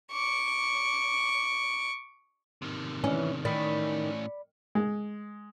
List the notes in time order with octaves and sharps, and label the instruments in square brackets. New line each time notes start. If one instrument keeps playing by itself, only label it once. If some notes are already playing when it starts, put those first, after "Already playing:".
[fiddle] C#6 D6
[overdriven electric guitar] C3 D#3
[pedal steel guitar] E3 [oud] C#4
[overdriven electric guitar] A2 C#4 [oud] D#3 [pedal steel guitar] D5 B5
[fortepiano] G#3